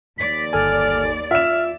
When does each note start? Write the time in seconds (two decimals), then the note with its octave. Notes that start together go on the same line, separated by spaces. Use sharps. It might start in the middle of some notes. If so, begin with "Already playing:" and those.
0.18 D#2 D5 B6
0.53 G1 A4 G#5 F6
1.31 F4 E5 F6 E7